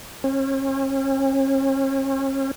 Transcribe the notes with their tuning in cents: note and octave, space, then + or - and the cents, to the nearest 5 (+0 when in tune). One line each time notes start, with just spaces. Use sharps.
C#4 -40